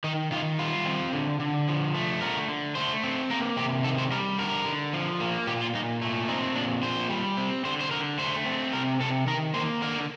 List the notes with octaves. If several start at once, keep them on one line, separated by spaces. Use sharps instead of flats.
D#3 D#4
D#3 F4
G3 F4
C4
D3
D3
F3
A3
D3 A#4
D3
A3 C5
C4
A#3 A#4
C3 G4
D#3 A4
C5
G3 A#4
D3 A#4
D3
F3
A#3
A#2 G4
F4
A#2 D#4
A3
C4 D#4
A#2 D4
A#2 C5
G3
C4
D3 C5
C5
D3 A#4
A3 C5
C4
C3 A#4
C3 A4
D#3 A#4
A#3 C5
D3 A#4